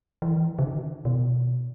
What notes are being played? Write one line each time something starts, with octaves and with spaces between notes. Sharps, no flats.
E3
C#3
D#3
B2